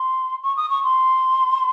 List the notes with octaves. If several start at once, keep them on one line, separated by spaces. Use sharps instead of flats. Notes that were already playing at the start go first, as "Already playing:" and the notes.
Already playing: C6
C#6
D#6
C#6
C6